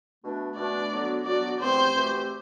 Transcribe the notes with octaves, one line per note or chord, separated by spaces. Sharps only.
B2 A3 D4
B2 A3 D4 D5
D3 F#3 B3 D4 F#4
D3 F#3 B3 D4 F#4 D5
E2 B2 A3 C4 G4 C5
E2 B2 A3 C4 G4